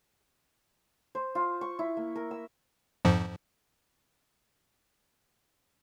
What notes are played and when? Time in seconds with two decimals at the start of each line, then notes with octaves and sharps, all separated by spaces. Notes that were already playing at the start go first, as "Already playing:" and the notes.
1.15 C5
1.35 F4
1.61 C#6
1.79 E4
1.97 A#3
2.16 A#4
2.31 E6
3.05 F2 G#2 F3